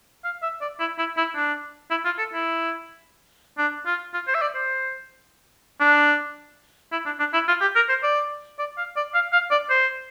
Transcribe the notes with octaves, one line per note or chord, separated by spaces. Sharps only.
F5
E5
D5
E4
E4
E4
D4
E4
F4
A4
E4
D4
F4
F4
C5
E5
D5
C5
D4
E4
D4
D4
E4
F4
G4
A#4
C5
D5
D5
F5
D5
F5
F5
D5
C5